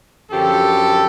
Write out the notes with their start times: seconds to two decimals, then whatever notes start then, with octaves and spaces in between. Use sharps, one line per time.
0.31 F#2 D3 F3 G4 A4